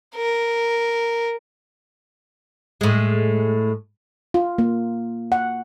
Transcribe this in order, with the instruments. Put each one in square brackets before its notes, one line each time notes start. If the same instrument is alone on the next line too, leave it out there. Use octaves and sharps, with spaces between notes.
[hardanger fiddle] A#4
[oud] A2 G#3
[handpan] F4
A#3
F#5